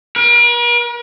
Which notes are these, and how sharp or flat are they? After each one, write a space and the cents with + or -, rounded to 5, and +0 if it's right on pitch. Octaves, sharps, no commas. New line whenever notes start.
A#4 +45